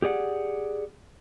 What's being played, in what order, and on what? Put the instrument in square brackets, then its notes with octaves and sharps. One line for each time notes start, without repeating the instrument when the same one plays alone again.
[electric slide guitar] G4 G#4 D5 F#5